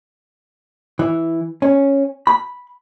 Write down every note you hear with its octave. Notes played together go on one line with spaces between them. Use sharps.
E3
C#4
B5